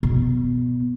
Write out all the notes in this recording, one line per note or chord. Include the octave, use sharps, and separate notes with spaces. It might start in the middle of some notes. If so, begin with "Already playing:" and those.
B2